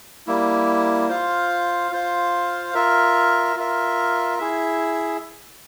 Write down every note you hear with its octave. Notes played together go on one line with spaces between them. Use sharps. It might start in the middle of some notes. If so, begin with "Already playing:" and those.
G3 A#3 E4
F4 C5 F5
F4 C5 F5
F4 A#4 E5
F4 A#4 E5
E4 G#4 E5